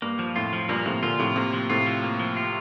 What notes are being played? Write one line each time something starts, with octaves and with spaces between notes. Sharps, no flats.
G2 A#3
F3
F2 A2 F4
F3
G2 A#2 A#3
A2 C3 F3
A#2 D3 F4
A2 C3 F3
A2 C3 A#3
F3
A2 C3 F4
F3
A#3
F3
F4